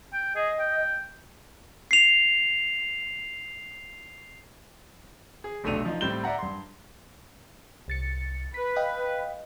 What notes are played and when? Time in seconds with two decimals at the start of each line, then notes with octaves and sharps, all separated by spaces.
0.13 G5
0.35 G#4 D#5
0.59 G5
1.91 C7 F7
5.44 G#4
5.64 F1 B1 A3 D4 D#7 F7
5.85 F3 D#4
6.01 A2 G3 C4 G6 E7 G7
6.23 D5 E5 F#5 A#5
6.39 G2 C6
7.88 C2 A6 C#7
8.54 B4 B6
8.76 D#5 F5 G5